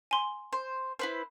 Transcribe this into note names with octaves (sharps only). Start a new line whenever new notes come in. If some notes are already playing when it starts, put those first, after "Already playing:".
G#5 C6
C5
E4 B4 C5